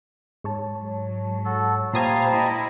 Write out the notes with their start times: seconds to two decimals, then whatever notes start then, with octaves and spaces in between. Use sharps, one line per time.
0.44 G#2 C#5 A5
0.77 F#3
1.45 F#4 A4
1.94 A#2 G3 C5 F5 A5 A#5 D#6 G#6
2.31 E4 D#5